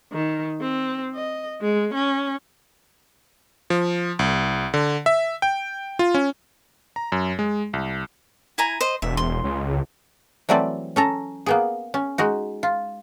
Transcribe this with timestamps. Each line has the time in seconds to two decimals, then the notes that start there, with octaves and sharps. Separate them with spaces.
0.13 D#3
0.61 C4
1.15 D#5
1.61 G#3
1.94 C#4
3.70 F3
4.19 C2
4.74 D3
5.06 E5
5.42 G5
5.99 F4
6.14 C#4
6.96 A#5
7.12 F#2
7.39 G#3
7.73 C2
8.58 E4 G#5 A#5
8.81 C5 D#5
9.02 E1 E5
9.17 C6
9.44 C#2
10.49 E3 F#3 G3 A3 C4 D5
10.96 C#4 A4 A#5
11.46 A#3 B3 G#4
11.94 C#4
12.18 G#3 D#4 F#4
12.63 F4